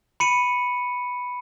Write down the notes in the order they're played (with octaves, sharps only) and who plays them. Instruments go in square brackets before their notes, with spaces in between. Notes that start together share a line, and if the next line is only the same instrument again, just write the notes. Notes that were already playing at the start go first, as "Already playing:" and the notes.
[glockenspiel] B5 C#7 D#7